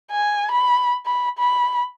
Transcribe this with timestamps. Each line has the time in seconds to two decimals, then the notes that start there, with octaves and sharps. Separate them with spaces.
0.11 G#5
0.51 B5
1.06 B5
1.38 B5